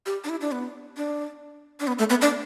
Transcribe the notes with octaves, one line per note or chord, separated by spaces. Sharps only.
G4
D4
E4
D4
B3
D4
D4
B3
A3
B3
D4